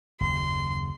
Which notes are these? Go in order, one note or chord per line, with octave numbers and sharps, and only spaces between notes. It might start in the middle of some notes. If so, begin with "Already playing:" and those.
F#1 D#2 C#3 C6